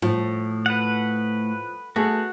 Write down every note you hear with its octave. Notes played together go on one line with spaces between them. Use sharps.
A2 F3
B4 F#5
A3 B3 F#4 G#4